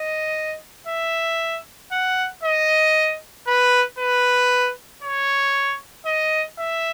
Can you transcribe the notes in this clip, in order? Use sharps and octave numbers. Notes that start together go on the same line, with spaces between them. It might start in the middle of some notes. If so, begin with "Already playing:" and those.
Already playing: D#5
E5
F#5
D#5
B4
B4
C#5
D#5
E5